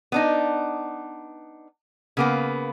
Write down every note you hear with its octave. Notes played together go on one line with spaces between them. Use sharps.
B3 D4 D#4
C#3 A#3 B3